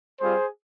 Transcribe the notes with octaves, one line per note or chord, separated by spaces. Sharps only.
G3 C4 F4 G#4 C5